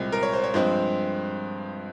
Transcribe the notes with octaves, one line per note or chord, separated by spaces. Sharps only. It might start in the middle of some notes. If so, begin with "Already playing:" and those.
Already playing: C2 A#2 G#3 C4
A#4
C#5
C5
C#5
G2 F3 G#3 C4 C5